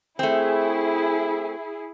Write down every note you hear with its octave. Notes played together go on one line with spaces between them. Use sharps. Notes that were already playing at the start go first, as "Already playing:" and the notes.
A3 C4 E4 G#4